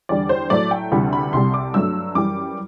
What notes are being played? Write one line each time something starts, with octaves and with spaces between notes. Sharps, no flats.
E2 D3 G3 D5
C5
A2 F#3 A3 D5
G5
D2 C3 E3 G3 B5
B5
C2 C3 G3 C6
D6
G2 F#3 A3 E6
F#2 E3 G3 D6